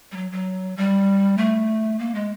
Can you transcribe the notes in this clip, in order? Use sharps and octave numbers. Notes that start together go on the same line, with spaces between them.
G3
F#3
F#3
G3
A3
A#3
G#3